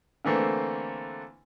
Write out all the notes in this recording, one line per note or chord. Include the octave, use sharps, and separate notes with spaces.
D3 E3 A3 A#3 C4